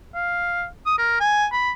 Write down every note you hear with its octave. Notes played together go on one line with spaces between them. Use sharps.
F5
D#6
A#4
G#5
B5